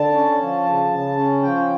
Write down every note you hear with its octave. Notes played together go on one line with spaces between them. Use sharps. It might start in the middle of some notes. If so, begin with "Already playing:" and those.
Already playing: D3 A5
C#4
F3
C#3
C#3
C#4
F3 G5